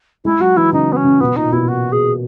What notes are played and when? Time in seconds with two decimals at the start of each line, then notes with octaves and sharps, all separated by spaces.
0.25 G#3 E4
0.40 F#3 F#4
0.56 E3 E4
0.72 C#3 D#4
0.92 B3
0.97 C#4
1.04 C#3
1.20 B2 B3
1.36 A#2 D#4
1.52 B2 E4
1.68 F#4
1.92 G#4